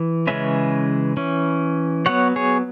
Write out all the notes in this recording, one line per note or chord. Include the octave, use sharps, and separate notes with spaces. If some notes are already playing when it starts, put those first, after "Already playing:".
Already playing: E3
C#3 E3 G#3 C#4 B4 E5
E3 C#4
F#3 B3 C#5 F#5
G#4 C#5